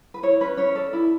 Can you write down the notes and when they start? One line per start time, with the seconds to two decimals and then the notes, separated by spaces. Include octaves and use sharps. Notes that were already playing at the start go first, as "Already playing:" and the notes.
0.14 B4
0.23 E4 C#5
0.41 C#4 B4
0.57 C#4 C#5
0.75 A4 D5
0.93 E4